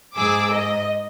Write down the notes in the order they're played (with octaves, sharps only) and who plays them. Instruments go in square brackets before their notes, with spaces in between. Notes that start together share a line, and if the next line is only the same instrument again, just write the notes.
[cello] G#2 [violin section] G#4 D6 E6
[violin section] D#5